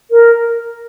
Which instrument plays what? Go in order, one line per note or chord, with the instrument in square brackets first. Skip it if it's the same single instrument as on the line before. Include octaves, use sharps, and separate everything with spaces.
[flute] A#4